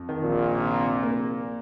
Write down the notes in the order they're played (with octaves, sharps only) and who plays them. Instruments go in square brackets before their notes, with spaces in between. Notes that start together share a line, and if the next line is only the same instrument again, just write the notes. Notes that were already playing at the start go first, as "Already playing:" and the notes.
Already playing: [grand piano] F2
D#3
[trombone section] A#1 A#2
[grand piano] C3
A#3